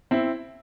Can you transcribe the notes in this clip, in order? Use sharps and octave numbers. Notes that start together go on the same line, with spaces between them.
C4 E4